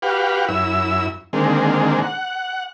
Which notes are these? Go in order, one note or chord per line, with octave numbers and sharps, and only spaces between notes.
F#4 G4 B4 F5
F#2 E4 E6
D3 D#3 G#3 A#3 C4
F#5